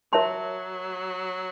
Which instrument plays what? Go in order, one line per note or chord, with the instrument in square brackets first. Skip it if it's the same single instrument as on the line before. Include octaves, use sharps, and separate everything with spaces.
[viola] F#3 [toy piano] A#4 C#5 E5 A5 C6